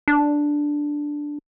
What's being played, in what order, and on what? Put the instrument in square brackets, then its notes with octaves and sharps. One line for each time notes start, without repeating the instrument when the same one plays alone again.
[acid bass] D4